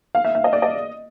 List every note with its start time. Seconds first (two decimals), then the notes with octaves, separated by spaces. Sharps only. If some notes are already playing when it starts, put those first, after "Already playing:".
0.15 F5
0.24 E5
0.35 E5
0.44 D#5
0.53 D5
0.62 D#5